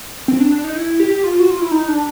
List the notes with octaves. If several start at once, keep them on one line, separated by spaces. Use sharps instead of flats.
C4
D4
D4
D#4
E4
G4
F4
F#4
F4
E4
D#4
D4